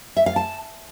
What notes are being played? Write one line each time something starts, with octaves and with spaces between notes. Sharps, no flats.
E5
F5
A5